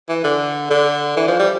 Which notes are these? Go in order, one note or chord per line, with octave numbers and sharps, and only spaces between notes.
E3
D3
D3
E3
F3
G3